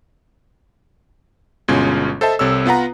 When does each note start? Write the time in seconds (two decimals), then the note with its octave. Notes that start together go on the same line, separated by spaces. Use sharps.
1.68 G1 B2 G#3 C#4 F4 G#6
2.21 A4 C5 D#5 E5 A5
2.39 C2 C3 A4 C#5 E6
2.66 B3 F4 B4 F#5 A#5